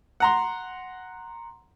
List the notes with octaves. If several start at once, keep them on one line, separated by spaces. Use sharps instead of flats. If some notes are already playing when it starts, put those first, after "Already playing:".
F#5 A#5 C6